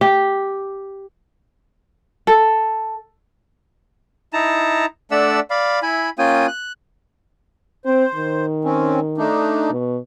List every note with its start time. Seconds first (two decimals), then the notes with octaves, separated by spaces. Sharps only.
0.01 G4
2.27 A4
4.33 D#4 E4 A5 A#5
5.11 A3 D4 D5 E5 F#5 E6
5.50 D5 F5 B5
5.83 E4 E5 G#5 B5
6.19 A#3 C#4 F4 G5 G#5 D#6
6.48 F#6
7.85 C4 C5
8.15 D#3
8.64 C4 C#4
9.18 A3 D4 D#4
9.71 B2